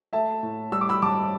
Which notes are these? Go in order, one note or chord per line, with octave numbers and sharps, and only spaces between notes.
A3 E5 A5
A2
G3 E6
D6
B5 E6
G2 A5 D6